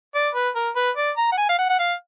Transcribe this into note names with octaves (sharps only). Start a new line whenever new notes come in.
D5
B4
A#4
B4
D5
A#5
F#5
G#5
F5
F#5
F#5
F5